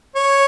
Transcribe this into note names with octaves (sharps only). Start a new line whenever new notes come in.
C#5